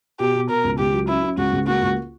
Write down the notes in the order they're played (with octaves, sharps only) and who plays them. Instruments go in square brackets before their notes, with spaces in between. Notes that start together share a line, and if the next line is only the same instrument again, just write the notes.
[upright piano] B2 [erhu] G4
[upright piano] B2
[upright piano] B2 [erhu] A#4
[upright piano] C#2
[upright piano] C#2 [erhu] G4
[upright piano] F#3
[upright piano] C#4 [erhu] E4
[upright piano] C#4
[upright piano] C#2 [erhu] F#4
[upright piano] C#2
[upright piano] A#3 [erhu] F#4
[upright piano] C#2